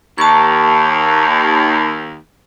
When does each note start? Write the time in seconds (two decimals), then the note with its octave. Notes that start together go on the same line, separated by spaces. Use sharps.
0.18 D#2 A5 C#6